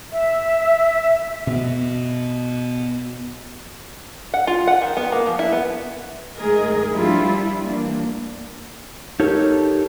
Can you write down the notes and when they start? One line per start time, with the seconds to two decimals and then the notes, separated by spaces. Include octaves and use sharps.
0.13 E5
1.47 B2 B3
4.34 F#5
4.47 F4
4.67 F#5
4.82 D#3
4.97 B3
5.12 A#3
5.27 F3
5.39 E4
5.52 B3
6.37 G#2 D#3 A3 G#4 A#4 D#5
6.92 F3 G3 D4 E4 F4
7.65 E3 A#3 D4
9.20 D#4 G4 A4 A#4 C#5